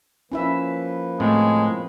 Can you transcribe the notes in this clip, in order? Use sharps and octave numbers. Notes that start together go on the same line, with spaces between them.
F3 A#3 C#4 E4 B4 E5
A2 G#3 C4